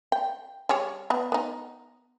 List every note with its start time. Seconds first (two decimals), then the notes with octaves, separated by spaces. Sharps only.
0.12 G5
0.69 G3 G#4 C#5
1.10 B3 B4
1.32 B3 D#4